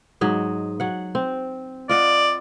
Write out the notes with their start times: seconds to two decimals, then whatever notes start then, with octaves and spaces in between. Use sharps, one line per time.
0.21 G#2 F#3 D#5
0.80 F#3 F#5
1.15 C4
1.89 F4 D5 D#5 F#5